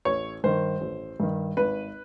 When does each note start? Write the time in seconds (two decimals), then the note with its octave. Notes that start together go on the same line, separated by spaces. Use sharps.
0.05 A1 C#5
0.44 G2 D#3 C5
0.81 A1
1.20 G2 D#3
1.57 G#1 B4